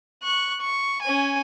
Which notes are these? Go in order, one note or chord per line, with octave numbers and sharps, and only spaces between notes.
C#6 F#6
C#6
C#4 G#5